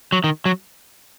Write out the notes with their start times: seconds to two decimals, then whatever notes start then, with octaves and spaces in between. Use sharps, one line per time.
0.12 F#3
0.24 D#3
0.46 F#3